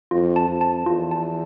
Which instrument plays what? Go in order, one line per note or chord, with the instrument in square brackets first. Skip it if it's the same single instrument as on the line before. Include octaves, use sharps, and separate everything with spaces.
[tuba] F2 [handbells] F4
[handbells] A5
[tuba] F2
[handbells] A5
[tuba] E2 [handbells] F4
[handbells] A5